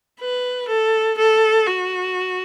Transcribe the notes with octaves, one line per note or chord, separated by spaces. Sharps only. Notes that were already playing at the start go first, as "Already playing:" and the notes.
B4
A4
A4
F#4